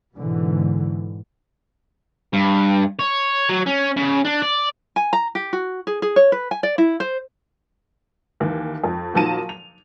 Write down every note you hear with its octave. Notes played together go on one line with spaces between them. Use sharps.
G#2 B2 D3 E3
G2
C#5
F#3
C#4
C#3
D4
D5
G#5
A#5
G4
F#4
G#4
G#4
C#5
B4
G#5
D5
E4
C5
D#2 E3
F2
A#2 D#3 F3 F#3 A5 D#7
F7